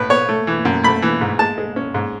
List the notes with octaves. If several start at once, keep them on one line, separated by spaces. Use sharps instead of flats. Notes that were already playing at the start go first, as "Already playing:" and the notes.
Already playing: A2 B4
B3 C#5
A3
E3
F#2
A3 B5
E3
G#2
G#3 A5
G#3
C#4
G#2